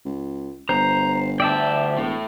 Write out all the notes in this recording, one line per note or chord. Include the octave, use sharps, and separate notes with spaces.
C#2
G1 C5 A#5
D2 D5 E5 G5 A5
E1 A2